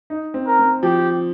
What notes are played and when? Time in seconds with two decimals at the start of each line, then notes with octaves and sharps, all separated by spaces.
0.10 D#4
0.34 C4
0.46 A#4
0.59 C4
0.83 F3 G4